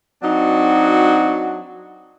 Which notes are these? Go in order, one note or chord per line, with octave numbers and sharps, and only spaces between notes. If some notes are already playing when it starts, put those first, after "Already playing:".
F#3 C4 D4 D#4 F#4